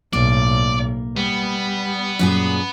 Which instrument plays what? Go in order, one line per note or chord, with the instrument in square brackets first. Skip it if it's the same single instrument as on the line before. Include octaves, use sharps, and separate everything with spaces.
[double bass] B1 A2 [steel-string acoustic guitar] A#3 [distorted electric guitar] D5
[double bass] G3 [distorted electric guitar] B3
[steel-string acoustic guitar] F#2 A#2 G#4